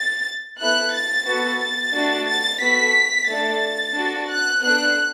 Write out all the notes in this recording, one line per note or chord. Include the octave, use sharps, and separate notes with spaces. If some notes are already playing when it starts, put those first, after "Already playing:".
Already playing: A6
B3 E4 A4 F#6
A6
B3 F#4 A4
A6
A3 D4 F#4 A4
A6
B3 F#4 A4 B6
A3 D4 A4 A6
D4 F#4 A4
F#6
B3 D4 A4 F#6